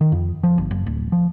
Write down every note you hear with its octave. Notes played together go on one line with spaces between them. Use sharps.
D#3
F2
F3
G1
F#1
D1
F3